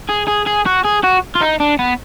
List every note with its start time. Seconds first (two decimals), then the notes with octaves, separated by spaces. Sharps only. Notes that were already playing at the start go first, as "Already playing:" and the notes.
0.09 G#4
0.27 G#4
0.46 G#4
0.66 F#4
0.84 G#4
1.03 F#4
1.35 F4
1.41 D#4
1.60 D4
1.79 B3